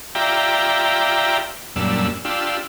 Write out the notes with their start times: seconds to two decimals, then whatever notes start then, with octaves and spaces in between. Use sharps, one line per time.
0.15 F4 G4 D5 E5 G5 A#5
1.76 F#2 A#2 G3 D4 E6
2.25 D4 F4 G4 E6